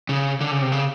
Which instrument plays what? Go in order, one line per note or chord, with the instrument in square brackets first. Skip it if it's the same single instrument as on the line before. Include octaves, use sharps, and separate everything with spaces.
[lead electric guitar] C#3
D3
C#3
C3
C#3